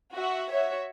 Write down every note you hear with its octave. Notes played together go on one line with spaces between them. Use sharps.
F#4 E5
F#4 C#5 E5